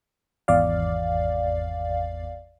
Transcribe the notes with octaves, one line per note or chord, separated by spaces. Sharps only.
G#1 E2 D5 F5